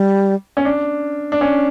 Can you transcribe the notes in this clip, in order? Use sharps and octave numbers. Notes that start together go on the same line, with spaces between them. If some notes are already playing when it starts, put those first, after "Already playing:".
Already playing: G3
C#4
D4
D4
C#4